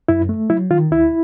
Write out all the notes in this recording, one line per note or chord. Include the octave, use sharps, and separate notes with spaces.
F#2 E4
A3
F#3 E4
D#3 F4
D2 E4